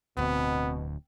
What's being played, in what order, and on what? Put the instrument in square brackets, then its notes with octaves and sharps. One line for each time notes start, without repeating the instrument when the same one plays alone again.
[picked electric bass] D1 D2 [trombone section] B2 [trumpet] B3 [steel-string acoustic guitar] C4